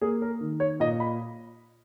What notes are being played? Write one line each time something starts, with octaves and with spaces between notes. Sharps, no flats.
A#3 G#4
A#4
D#3
C#5
A#2 D#5
B5